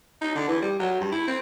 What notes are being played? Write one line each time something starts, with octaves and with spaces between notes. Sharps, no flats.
D#4
D3
E3
G3
F#3
G2
E4
C4